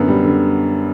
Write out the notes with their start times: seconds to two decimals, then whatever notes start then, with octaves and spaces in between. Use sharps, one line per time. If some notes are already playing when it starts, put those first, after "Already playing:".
Already playing: F#2 D3 B3
0.08 G3
0.24 D3